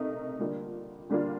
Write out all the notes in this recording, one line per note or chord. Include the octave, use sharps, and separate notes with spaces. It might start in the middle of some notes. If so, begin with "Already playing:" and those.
Already playing: C3 A3 D#4 A#4
D3 G3 A#3 D4 F4
D3 G3 A#3 D4 F4